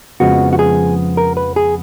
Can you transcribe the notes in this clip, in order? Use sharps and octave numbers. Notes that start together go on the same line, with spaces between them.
F2 C#3 F3 G#3 B3 F#4
F#4
G#4
A#4
B4
G#4